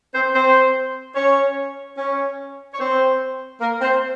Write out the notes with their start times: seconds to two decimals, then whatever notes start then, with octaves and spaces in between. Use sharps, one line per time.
0.14 C4 C5
0.34 C4 C5
1.15 C#4 C#5
1.97 C#4 C#5
2.73 C#5
2.80 C4 C5
3.61 A#3 A#4
3.81 C4 C5